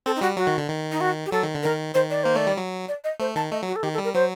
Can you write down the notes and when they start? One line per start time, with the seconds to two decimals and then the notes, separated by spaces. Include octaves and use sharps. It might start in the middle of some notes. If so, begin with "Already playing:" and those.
0.06 C4 A4
0.16 D#4
0.21 G3 F#4
0.37 F#3 F#4
0.47 D#3
0.58 D3
0.68 D#3
0.92 D#4
1.01 F#4
1.26 G4
1.32 F#3 A4
1.43 D#3
1.55 D3
1.63 D#3 A#4
1.94 D#3 C5
2.11 D5
2.24 A#3 C5
2.36 A3 D5
2.47 G3
2.57 F#3
2.88 D5
3.04 D#5
3.20 A3 C5
3.36 D#3 A5
3.51 A3 D#5
3.63 F#3
3.68 F#4
3.76 A4
3.83 D#3 G4
3.94 A4
3.98 G3
4.04 A#4
4.14 F#3 C5